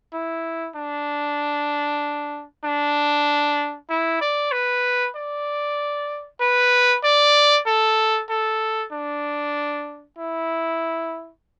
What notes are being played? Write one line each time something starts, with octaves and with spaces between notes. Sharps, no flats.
E4
D4
D4
E4
D5
B4
D5
B4
D5
A4
A4
D4
E4